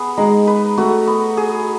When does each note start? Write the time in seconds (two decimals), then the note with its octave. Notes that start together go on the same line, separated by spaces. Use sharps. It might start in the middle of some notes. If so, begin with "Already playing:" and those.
Already playing: B3 G#4
0.17 G#3 D#4
0.47 B4
0.78 A3 F#4
1.08 B3
1.37 G#4